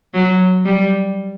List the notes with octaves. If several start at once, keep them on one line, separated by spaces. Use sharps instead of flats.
F#3
G3